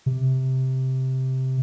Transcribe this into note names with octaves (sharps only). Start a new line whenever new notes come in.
C3